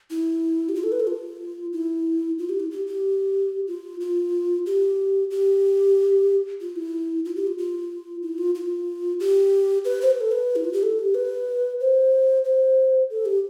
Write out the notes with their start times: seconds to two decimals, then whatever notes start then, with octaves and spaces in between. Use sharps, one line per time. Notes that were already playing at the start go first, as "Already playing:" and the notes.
0.10 E4
0.69 G4
0.75 F4
0.83 A4
0.92 B4
1.00 A4
1.08 F4
1.73 E4
2.39 F4
2.49 G4
2.60 E4
2.71 G4
2.87 G4
3.68 F4
4.01 F4
4.66 G4
5.31 G4
6.61 F4
6.76 E4
7.25 F4
7.36 G4
7.47 F4
7.58 F4
8.23 E4
8.38 F4
8.55 F4
9.20 G4
9.85 B4
10.02 C5
10.11 B4
10.21 A4
10.32 B4
10.56 E4
10.65 F4
10.73 G4
10.83 A4
10.99 G4
11.15 B4
11.80 C5
12.45 C5
13.10 A4
13.26 G4